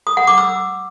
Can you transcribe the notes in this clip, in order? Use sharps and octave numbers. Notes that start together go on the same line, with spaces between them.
D#6
F#5
D6
E6